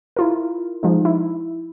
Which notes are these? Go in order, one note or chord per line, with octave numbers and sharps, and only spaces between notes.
E4 F4 A#4
F3 G#3 D#4
E4